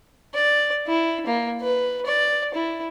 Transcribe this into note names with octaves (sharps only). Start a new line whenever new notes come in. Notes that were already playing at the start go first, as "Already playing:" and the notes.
D5
E4
A#3
B4
D5
E4